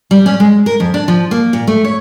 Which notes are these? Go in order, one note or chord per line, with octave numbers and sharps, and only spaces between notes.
G3
C#4
G#3
A#4
F2
D4
F3
A#3
A#2
A3
C#5